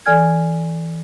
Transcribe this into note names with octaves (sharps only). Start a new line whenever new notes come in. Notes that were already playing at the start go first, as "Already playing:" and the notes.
E3 A4 D5 G#5 F6 G#6